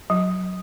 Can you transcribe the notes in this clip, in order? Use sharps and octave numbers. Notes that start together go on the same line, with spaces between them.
F#3